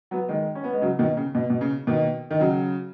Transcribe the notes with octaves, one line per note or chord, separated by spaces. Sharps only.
F#3 B3
D#3 G#3
C#4
B3
G#3
C#3 F#3
B2 D#3
C#3
B2
B2
C#3
B2 D#3
D#3
C#3 F#3